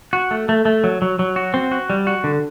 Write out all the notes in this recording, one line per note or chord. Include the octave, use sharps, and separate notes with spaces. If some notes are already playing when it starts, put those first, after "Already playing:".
F#4
A3
A3
A3
F#3
F#3
F#3
F#4
C4
F#4
G3
F#4
D3